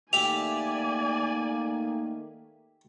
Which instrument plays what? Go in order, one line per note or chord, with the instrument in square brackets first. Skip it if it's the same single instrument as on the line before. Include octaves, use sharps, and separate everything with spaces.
[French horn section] D#3 A3 A#3 [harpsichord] G4 E5 [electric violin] D5 G#5 [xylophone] F7